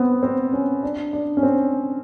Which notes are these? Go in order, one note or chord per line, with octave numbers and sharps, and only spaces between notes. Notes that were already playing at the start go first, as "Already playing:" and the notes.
Already playing: B3 C4
C4
C#4
D4
D4
C#4
C4